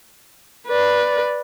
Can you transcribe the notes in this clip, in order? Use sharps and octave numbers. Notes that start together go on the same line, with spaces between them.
B4 D5